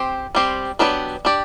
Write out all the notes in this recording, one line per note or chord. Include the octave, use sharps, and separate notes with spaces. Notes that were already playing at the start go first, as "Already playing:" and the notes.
Already playing: C4 G4 C5
G3 C4 G4 C5
F#3 B3 D4 G4 B4
D4 G4 D5